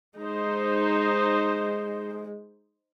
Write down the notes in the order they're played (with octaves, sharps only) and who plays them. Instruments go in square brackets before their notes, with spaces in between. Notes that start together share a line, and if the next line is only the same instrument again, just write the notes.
[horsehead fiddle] G#3 [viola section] D#4 C5